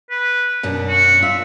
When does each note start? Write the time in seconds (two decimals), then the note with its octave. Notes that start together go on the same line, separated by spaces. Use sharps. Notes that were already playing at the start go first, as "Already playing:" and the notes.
0.10 B4
0.63 F#2 B2 D4
0.88 F#4
1.23 F4 E5